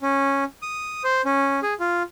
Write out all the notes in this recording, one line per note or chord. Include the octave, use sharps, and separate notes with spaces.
C#4
D#6
C5
C#4
G#4
F4